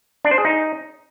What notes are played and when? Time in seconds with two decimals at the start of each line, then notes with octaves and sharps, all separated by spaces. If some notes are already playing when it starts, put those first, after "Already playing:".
0.25 D4
0.31 C5
0.38 G#4
0.45 D#4